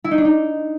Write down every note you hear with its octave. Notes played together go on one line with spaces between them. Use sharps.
E4
D#4
D4
D#4